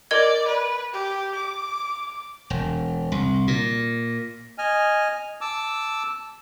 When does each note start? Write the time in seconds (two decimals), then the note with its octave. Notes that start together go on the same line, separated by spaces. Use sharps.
0.11 A#4 D5 D#5 G#6
0.47 B4
0.93 G4
1.35 D6
2.50 E1
3.12 C2
3.48 A#2
4.58 D#5 G#5 F6
5.41 A5 D6 E6